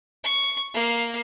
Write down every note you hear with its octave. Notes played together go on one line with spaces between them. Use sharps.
C#6
A#3 F5